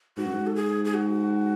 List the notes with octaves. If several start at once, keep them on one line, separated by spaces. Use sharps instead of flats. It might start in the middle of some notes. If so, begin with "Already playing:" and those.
G#2 F#4
F#2
G#2
A4
G#4
G#4
F#4